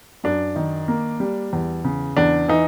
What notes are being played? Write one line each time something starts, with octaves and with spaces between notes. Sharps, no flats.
F#2 D4
D#3
A#3
G3
E2
C#3
E2 D4
E3 D#4